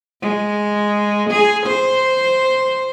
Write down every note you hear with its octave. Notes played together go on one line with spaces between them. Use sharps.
G#3
G#4
C5